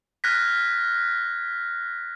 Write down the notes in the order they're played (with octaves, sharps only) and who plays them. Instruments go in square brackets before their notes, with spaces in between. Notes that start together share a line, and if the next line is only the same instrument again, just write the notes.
[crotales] F6 F#6 G#6 A#6 B6